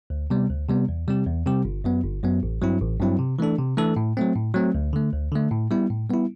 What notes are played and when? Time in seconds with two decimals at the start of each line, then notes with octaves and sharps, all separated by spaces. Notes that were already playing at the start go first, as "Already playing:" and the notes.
0.10 D2
0.30 C3 G3 B3
0.49 D2
0.69 C3 G3 B3
0.89 E2
1.08 C3 G3 C4 G4
1.27 E2
1.46 C3 G3 C4 G4
1.65 G1
1.84 F#2 F#3 B3
2.04 G1
2.23 F#2 F#3 B3
2.43 A1
2.62 G2 F#3 C4 E4
2.81 A1
3.00 G2 F#3 C4 E4
3.19 C3
3.39 E3 A3 D4 A4
3.58 C3
3.77 E3 A3 D4 A4
3.96 A2
4.17 F#3 A3 C4
4.35 A2
4.54 F#3 A3 C4
4.75 D2
4.93 D3 A3
5.12 D2
5.32 D3 A3
5.51 A2
5.71 G3 B3 E4
5.90 A2
6.10 G3 B3 E4